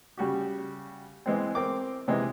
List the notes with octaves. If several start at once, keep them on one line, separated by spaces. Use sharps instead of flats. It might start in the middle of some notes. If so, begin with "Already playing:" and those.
C#3 G3 F#4 G4
E3 G#3 B3 C4
C4 A#4 D6
C3 E3 G#3 D#4